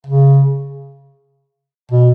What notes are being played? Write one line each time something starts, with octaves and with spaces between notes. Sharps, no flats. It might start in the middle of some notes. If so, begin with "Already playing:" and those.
C#3
B2